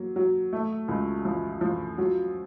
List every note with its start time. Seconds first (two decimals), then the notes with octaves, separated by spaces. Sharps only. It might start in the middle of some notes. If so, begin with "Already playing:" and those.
Already playing: F#3 A#3
0.16 F#3
0.53 A3
0.88 C#2
1.25 F3
1.61 F3
1.98 F#3